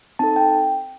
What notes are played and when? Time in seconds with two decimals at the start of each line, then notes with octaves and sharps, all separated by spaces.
0.19 C4 D#4 A4 A5
0.36 G5